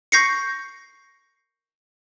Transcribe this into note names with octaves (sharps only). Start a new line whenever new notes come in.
C#6 G6 A#6 C7 C#7